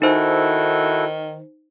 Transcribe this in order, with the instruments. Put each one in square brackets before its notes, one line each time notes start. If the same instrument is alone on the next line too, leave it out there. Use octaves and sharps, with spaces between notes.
[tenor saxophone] D#3 [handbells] D#4 C5 [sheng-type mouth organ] E4 F#4 A4